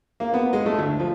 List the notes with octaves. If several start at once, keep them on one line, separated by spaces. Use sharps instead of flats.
A#3
B3
G#3
A3
D2
F3